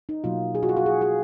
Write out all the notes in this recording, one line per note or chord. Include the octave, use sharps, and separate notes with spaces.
D#4
B2 F#3 A#3 F4
G#4
F#4
F4
F#4
G#4
G#4